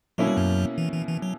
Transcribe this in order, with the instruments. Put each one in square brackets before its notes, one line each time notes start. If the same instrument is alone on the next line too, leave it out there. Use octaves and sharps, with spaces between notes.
[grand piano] B2 A#3 C#4 E4 [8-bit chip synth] F#3
[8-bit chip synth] G3
F#2 F#3
E3
E3
E3
F#3